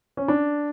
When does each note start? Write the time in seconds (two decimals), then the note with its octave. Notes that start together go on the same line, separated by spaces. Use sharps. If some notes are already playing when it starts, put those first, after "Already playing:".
0.17 C#4
0.28 D4